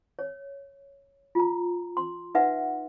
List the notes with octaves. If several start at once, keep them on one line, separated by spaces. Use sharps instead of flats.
C#5
F4 A#5
C6
D#4 B4 E5 F#5